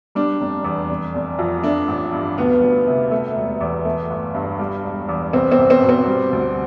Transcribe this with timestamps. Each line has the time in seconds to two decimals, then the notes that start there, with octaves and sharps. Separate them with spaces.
0.15 G3 D4
0.41 F1
0.64 E2
0.90 F1
1.15 F1
1.39 F2
1.63 A3 D4
1.88 A1
2.12 G2
2.38 D2 B3
2.62 D2
2.87 C3
3.11 A3
3.35 E1
3.61 E2
3.85 A3
4.10 G1
4.34 G2
4.59 G3
4.84 E1
5.09 E2
5.33 C2 C4
5.52 C4
5.58 C2
5.70 C4
5.83 B2
5.89 C4
6.07 G3
6.33 D2